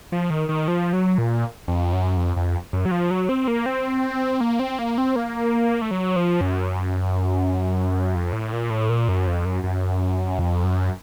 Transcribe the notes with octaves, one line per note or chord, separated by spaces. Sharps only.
F3
D#3
D#3
F3
F#3
A#2
F2
F#2
F2
F2
F#2
F#3
F3
F#3
C4
A#3
C4
A#3
C4
A#3
C4
A#3
A3
F#3
F3
F#2
F2
A2
A#2
A2
A#2
F#2
F2
F#2
F#2
F2
F#2